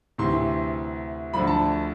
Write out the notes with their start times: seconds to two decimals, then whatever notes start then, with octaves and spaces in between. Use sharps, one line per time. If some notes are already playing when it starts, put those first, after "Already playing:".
0.18 D2 C3 E3 C6
1.34 D2 D3 F3 B5
1.47 A5